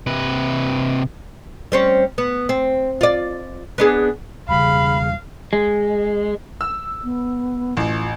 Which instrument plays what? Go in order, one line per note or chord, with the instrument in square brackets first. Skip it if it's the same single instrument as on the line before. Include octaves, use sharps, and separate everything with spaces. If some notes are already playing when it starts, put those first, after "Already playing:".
[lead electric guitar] C3 B4
[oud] G3 C4 C#4
B3
C4
F4 D5
B3 D4 G#4
[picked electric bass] E1 G3 [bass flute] C#3 [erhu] F5 [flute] B5
[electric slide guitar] G#3
[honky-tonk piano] E6
[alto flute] B3
[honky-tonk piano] A1 [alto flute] F4